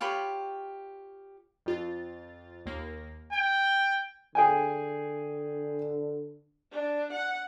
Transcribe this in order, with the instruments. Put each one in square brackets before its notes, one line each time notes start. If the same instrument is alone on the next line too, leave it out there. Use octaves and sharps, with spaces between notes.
[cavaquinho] F4 G4 C#5 B5
[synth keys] F2 F4 A6
D#2 A#3 A#6
[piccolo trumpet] G5 [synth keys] G#6
[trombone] D3 [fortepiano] G#4 G5 G#5
[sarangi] D4
F#5